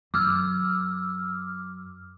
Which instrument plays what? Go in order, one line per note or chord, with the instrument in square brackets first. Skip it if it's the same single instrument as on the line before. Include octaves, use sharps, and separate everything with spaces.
[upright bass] F#2 [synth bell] D6 E6 F6